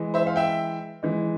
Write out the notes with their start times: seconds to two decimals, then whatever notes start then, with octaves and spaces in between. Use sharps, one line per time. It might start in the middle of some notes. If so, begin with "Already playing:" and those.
Already playing: E3 G#3
0.14 C5 E5
0.27 F5
0.36 E5 G5
1.03 E3 G#3